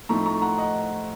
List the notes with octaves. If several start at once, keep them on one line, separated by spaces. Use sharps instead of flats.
A2 F3 A3 C4 D#4 A#5 C#6
A#5 C#6
F#5 A#5
D#5 F#5